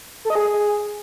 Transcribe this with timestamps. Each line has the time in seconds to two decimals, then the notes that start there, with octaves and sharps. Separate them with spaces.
0.25 A4
0.30 D#5
0.35 G#4